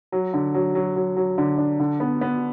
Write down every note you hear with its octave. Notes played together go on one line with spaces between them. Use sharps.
F#3
D3
F#3
F#3
F#3
F#3
D3
D4
D3
B3
B3